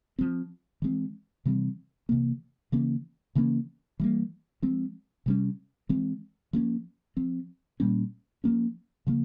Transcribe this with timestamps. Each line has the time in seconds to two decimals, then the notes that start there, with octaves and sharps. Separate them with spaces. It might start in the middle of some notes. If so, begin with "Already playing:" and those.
0.19 F3 C4
0.82 E3 G#3 C4
1.45 C3 E3 G3 C4
2.09 C3 E3 A#3
2.72 C#3 E3 A#3 C#4
3.35 C#3 E3 A#3 C#4
4.00 E3 G3 A#3
4.62 F3 G#3 C4
5.26 C3 G3 C#4
5.89 E3 G#3 C4
6.53 F3 A#3 C#4
7.17 F3 C4
7.80 A#2 G3 A#3 C#4
8.44 F3 A#3 C#4
9.07 C#3 F3 A#3